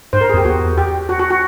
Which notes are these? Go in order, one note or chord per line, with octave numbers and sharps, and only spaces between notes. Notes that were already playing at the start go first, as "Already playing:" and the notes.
G#2 C5
A#4
G#4
F2
G4
E2 F#4
G4
F#4
F#4
F#4